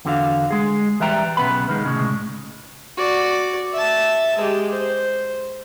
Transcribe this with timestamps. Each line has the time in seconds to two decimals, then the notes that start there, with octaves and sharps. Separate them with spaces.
0.05 E2 D3 F#4 F5
0.51 G#3 G#4
1.00 E3 G3 B4 E5 G5 A#5
1.37 B1 C#3 A3 B3 B4 B5
1.68 C#2 D#3 G#3
1.85 C2 A2 C#3 G#3
2.97 F#4 D5
3.73 E5 A5
4.38 G#3 G4
4.72 C5